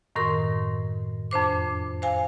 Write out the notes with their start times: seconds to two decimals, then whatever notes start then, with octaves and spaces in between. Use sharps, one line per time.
0.15 F#2 A2 D#3 A#4 C6
1.31 F2 D4 C5 D6
2.02 C5 F5 G#5